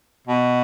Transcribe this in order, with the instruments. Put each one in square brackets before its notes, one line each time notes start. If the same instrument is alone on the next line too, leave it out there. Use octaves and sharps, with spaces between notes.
[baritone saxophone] B2